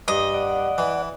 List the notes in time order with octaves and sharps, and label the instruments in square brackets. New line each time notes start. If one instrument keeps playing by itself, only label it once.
[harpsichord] G2 [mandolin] D#5
[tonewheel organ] D5 F#5
[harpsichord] E3